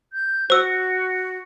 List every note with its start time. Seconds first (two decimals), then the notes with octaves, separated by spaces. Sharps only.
0.13 G6
0.50 F#4 C5 E6